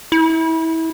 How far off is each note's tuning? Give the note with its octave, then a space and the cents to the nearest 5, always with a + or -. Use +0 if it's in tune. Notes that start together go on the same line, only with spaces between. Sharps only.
E4 -25